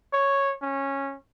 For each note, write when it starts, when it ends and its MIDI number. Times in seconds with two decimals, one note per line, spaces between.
0.13 0.54 73
0.62 1.16 61